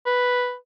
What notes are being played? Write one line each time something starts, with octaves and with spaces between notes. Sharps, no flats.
B4